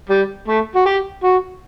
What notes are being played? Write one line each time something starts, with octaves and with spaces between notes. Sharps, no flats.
G3
A3
F#4
G4
F#4